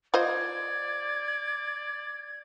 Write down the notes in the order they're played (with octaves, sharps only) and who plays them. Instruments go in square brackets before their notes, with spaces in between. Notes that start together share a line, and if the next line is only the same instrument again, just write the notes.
[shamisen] F4 C5 D#5 [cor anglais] D5 [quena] G#6